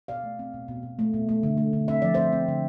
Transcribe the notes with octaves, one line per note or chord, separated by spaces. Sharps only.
B2 D5 F5
A3
C4
B2
B2
B2
A3
B2
A3
D3
A3
D3
C4 E5
F3 D5
C4 C5 E5
C4
D3